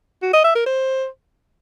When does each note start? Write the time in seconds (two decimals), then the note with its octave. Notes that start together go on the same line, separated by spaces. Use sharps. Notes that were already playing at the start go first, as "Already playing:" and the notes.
0.22 F#4
0.33 D#5
0.44 E5
0.55 A#4
0.66 C5